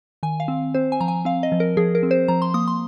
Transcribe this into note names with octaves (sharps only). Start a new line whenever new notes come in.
D#3 G#5
F5
C4
C4 C5
G#5
F3 A#5
G#5
C4 F5
D#5
F3
A#4
F3 G#4
A#4
C4
C5
F3 A#5
C6
A#3 D#6
C6